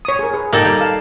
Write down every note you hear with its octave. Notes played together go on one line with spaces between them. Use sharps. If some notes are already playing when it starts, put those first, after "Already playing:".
C#5 D#6
G#4 A#4
G#4 B4
A#3 D#4 G4 A4 G5
G3
F5 A5